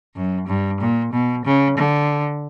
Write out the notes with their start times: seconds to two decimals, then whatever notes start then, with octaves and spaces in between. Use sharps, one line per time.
0.16 F#2
0.48 G2
0.80 A#2
1.13 B2
1.45 C#3
1.77 D3